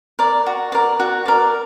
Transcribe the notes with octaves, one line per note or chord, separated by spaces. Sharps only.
A#4 D5
F#4
A#4 D5
F#4
A#4 D5